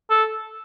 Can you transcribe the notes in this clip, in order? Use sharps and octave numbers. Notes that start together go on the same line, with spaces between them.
A4